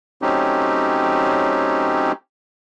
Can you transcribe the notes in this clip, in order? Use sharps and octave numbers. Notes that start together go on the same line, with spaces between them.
F#3 A3 C4 C#4 D#4 G4